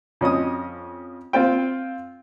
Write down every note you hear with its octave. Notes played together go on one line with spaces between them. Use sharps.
F2 C#4 D#5 D#6
C4 F4 C5 G5